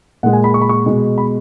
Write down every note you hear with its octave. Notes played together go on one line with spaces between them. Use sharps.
A#2 G#3 F#5
G#5
B5
C#6
B5
C#6
B2 G#3
B5